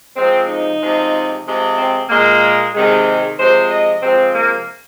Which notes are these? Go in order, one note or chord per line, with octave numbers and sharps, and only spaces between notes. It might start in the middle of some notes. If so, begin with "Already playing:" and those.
C3 F3 G#3 C4
D#4
C3 F3 G#3
C3 F3 G#3
C4
A#2 G#3 A#3
C3 D#3 G#3
C3 F3 G#3 C5
D#5
C3 F3 G#3 C4
A#3